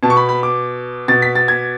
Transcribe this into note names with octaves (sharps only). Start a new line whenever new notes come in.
B2 A5
C#6
B5
B5
D6
B2 A6
B6
A6
G#6